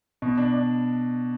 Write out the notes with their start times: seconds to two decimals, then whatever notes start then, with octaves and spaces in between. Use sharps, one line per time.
0.22 B2
0.37 D4
0.53 D4